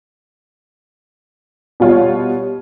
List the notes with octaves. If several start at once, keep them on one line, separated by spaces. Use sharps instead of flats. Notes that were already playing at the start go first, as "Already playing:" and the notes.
B2 G3 F4 C#5